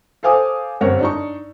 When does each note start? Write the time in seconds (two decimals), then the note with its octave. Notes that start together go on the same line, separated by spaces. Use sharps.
0.23 A4 C5 F5 G#5 D6 D#6
0.81 G1 F#2 C4 A#4 C#5 F#5
1.01 D4 D#4 C#6